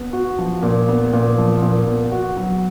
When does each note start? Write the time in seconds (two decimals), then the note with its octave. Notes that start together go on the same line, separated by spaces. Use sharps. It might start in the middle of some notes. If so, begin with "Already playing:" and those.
Already playing: B3
0.13 F#4
0.39 F3
0.62 A#2
0.89 B3
1.13 A#2
1.38 F3
1.62 A#2
1.87 B3
2.12 F#4
2.37 F#3